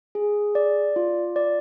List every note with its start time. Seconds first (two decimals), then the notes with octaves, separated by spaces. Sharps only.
0.15 G#4
0.55 D5
0.96 F4
1.36 D5